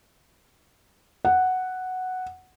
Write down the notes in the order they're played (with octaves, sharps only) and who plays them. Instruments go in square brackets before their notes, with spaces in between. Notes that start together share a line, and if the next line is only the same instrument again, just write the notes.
[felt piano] F#5